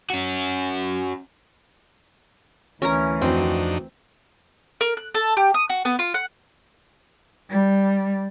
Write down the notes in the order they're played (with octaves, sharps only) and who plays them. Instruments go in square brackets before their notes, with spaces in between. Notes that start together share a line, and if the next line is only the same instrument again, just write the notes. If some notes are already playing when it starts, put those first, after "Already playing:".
[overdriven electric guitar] C#4 F#4
[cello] D2 E3 [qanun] C#4 A#4 A#5
[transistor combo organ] F2 D4 D#4 [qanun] C4 [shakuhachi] F#4
[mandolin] A#4
F#6
A4
G4
D#6
F#4
B3
F4
F#5
[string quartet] G3